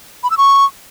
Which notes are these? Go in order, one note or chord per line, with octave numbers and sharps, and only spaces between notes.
B5
E6
C#6